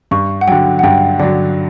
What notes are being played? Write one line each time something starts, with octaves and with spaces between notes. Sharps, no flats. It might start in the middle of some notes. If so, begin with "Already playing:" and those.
G2 C#6
F#5
D3 F#3 G5
F#5
G2 G5
D3 F#3 D5